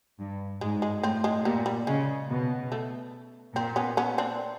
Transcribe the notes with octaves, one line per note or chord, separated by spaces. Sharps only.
G2
G#2 G#3
G#3
A2 C4
G#3
A#2 G3
G3
C#3 G#3
B2
A3
A#2 C4
B3 C#4
B3 C#4
C4 D4